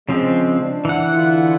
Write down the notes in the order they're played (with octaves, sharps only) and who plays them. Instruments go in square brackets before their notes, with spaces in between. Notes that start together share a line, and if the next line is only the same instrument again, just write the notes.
[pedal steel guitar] C#3 F3 C4 [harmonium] G#3
[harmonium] D4
[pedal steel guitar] E3 F#5
[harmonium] D3 E4 F4